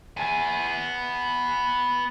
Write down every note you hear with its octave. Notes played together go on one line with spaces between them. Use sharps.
B3 G#5